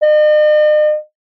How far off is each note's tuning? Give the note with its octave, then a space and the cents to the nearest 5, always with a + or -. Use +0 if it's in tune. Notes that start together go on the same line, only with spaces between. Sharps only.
D#5 -45